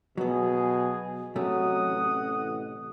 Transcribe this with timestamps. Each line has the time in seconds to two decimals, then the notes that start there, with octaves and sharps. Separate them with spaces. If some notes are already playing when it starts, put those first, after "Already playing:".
0.17 B2 F#3 B3 G#4
1.36 C3 F#3 A3 C#4 D#5 F#5 D#6
1.87 A1